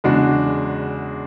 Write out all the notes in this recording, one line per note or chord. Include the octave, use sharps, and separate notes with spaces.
E2 C#3 G#3 D4 F#4